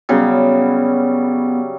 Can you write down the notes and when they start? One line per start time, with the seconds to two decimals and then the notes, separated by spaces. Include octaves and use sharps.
0.09 C#3 F#3 G3 B3